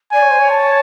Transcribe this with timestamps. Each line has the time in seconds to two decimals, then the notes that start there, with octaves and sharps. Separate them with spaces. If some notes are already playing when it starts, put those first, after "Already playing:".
0.12 D5 G#5
0.21 C#5
0.30 C5
0.38 C#5
0.51 A5